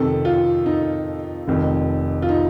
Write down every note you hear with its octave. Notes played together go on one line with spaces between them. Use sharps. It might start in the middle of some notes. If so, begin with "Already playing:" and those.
Already playing: F2 C3 D#3 A4
F4
D#4
F1 F2 D#3
F4
D#4